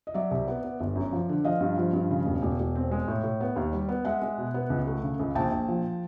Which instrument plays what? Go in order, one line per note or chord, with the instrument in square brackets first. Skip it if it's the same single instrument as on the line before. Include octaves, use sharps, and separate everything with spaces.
[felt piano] D#5
F#3 D5 E5
C2
B3
B3
G1
F#2
F3
D3
F3 D#5 F5
G2
F3
G2
C#3
E1
E1
E1
C4
G#3
A2
A2
B3
D#2
G3
B3
G#3 E5 F#5
G#3
B2
B3
C#2
A3
C#3
C#2
A#1 G5 A5
A#1
F3